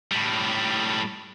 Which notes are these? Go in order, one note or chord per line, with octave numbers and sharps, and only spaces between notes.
A2 G3